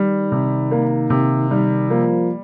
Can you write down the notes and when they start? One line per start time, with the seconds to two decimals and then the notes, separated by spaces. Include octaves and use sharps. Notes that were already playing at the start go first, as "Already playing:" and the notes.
Already playing: D#3 G3
0.32 C3
0.71 A#3
1.10 C3
1.50 D#3 G3
1.90 F3 A#3